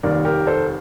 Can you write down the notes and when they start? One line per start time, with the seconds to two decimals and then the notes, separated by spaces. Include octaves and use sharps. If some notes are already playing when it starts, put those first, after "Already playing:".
0.03 F1 D#2 D#3 G3 A#4 D5
0.25 G4 A#4
0.47 A4 C5